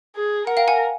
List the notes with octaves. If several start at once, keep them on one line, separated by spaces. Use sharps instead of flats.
G#4
A#4 F#5
F5 G5
F#5 G#5